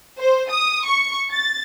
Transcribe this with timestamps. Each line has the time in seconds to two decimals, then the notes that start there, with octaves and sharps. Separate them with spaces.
0.18 C5
0.50 D#6
0.84 C#6
1.32 A6